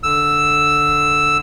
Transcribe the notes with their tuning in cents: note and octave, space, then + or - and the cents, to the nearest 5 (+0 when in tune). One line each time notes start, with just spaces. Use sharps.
D3 +0 E6 +0